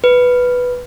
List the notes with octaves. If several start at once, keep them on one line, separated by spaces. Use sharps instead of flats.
B4